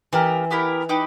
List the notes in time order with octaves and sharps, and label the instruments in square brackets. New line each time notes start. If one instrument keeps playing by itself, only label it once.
[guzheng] E3 [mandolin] B3 G4 A#4
[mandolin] B3 E4 G4 A#4
D#4 G4 B4